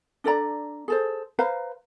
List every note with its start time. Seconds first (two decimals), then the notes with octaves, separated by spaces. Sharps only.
0.24 D4 A4 D5 A#5
0.88 G#4 A4 C5
1.39 B4 C5 F5 A#5